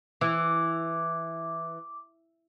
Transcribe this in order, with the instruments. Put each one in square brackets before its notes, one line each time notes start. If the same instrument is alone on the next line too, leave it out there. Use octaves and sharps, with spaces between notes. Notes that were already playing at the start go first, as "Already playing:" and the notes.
[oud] E3 [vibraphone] D6